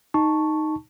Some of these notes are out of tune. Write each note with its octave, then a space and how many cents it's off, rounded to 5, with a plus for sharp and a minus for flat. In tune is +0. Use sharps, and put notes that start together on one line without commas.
D#4 +0 A5 +0 C#6 +0